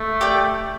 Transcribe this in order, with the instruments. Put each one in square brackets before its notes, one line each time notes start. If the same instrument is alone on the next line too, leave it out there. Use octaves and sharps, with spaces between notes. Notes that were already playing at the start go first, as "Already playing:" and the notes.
Already playing: [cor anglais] A3
[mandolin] G4 D5 G5